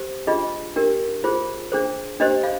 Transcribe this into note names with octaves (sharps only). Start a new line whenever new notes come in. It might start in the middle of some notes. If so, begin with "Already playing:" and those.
Already playing: G4 C5
D4 F4 G#4 D#5
D4 G4 A#4
F4 G#4 C5
D4 G#4 C5
D4 G4 C5 D#5
F5